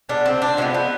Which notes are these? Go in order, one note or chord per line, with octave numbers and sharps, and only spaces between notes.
B2 G#3 B3 D4
C4
D4
C3 F3 G#3 B3 C4
B3